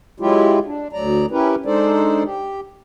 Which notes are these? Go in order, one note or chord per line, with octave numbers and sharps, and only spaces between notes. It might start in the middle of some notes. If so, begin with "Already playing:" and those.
F#3 G#3 E4 F4 G4
D4
D2 F#3 D5 A#5
C#4 E4 G4 A#4 B4
G#3 D4 D#4 A4 C5 D5
G4